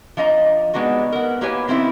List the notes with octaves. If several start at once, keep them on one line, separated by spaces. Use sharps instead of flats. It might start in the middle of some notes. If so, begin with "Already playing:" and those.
F3 D4 D#5 A#5
G3 G#3 B3 D4 D#4 F#4
B3 A#4
A#3 E4 G4 B4 C#5 G#5
D#3 C4 C#4 E4